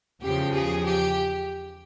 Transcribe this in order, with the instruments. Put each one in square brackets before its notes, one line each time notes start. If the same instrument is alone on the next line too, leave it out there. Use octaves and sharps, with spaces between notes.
[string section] E2 C#3 F3 G4
G#4
G4